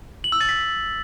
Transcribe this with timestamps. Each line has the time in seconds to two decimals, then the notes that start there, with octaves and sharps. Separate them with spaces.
0.24 F#7
0.32 E6
0.41 A6
0.49 B6